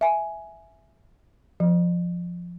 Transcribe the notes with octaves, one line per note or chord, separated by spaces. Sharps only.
E5 G#5
F3